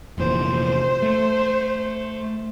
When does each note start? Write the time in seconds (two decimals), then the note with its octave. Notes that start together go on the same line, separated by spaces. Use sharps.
0.18 F1 A#2 E3 C5
1.02 A3